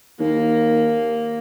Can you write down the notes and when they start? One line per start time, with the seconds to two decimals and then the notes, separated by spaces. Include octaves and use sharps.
0.20 D#2 A#3